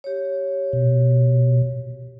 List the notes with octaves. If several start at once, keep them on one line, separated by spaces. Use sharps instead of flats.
G4 C#5
B2